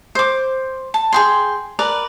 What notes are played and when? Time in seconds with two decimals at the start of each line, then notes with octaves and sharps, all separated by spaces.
0.15 C5 D6
0.94 A5
1.13 G#4 G5 C6
1.79 A#4 B4 D5